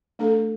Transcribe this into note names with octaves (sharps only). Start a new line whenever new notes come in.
A3 D4 A4